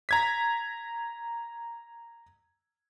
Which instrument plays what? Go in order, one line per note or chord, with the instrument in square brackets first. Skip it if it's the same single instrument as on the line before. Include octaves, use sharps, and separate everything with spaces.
[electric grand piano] A#5 G#6 B6